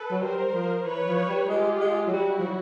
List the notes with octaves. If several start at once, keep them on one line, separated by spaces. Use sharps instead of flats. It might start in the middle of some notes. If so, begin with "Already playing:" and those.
Already playing: A4 B4
F#3
G3 A#4 C5
F3
E3 B4 C#5
F3
G3
G#3 F4 G4
G#3
F#3
G3 E4 F#4
F3
F#3